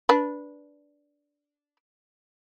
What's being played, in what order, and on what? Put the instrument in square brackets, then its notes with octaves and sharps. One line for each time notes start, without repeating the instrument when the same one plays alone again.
[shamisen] D4 B4